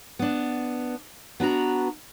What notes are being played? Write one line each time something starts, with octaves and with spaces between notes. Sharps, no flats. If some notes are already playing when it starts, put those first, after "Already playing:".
B3 D4
B3 D4 F#4 A#5